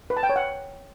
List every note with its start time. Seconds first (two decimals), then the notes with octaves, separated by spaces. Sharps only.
0.10 B4
0.17 A5
0.23 G5
0.29 C#5
0.36 F#5